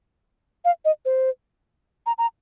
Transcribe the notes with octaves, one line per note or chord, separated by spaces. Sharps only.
F5
D#5
C5
A#5
A#5